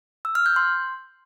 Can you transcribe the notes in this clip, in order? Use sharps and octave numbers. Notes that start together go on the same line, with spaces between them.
E6
F6
G6
C6